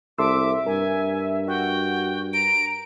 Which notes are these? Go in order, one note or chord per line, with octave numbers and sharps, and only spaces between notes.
C2 A4 E5 C6 D6 E6
G2 A#4 G#5
F#4 G5
A#5 D7